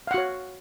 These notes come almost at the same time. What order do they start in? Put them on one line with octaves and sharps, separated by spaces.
F5 F#5 F#4 C#5